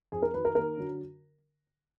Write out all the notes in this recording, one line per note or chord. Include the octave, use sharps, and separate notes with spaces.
F2 G#4
A#4
D#3 F#3 B4
A#4
D#2 A#4
D3 F#3